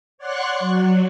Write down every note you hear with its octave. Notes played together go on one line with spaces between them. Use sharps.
C#5 D5 F#5 C6 C#6 F#6
F#3